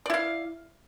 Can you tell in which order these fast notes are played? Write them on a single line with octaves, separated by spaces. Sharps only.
D5 E4 F5